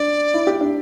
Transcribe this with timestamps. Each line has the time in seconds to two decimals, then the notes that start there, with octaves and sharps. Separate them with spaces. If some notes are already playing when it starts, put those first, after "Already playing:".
Already playing: D4 D5
0.34 E4
0.47 G4
0.61 D4